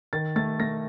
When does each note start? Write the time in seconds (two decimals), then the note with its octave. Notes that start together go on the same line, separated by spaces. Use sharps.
0.13 D#3 A6
0.36 A3 A6
0.59 A3 A#6